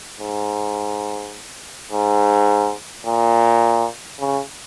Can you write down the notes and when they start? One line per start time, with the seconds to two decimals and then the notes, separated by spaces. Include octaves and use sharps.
0.20 G#2
1.92 G#2
3.06 A#2
4.20 C#3